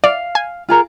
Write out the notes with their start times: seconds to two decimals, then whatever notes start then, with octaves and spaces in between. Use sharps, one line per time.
0.04 D5 F5
0.35 G#5
0.69 F4 G#4 A#4